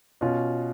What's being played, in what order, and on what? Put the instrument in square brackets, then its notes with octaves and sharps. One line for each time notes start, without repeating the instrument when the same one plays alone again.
[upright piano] B2 [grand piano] C#4 F4